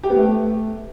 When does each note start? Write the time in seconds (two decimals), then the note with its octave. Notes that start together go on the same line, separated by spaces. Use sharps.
0.04 G4
0.10 B3
0.16 A3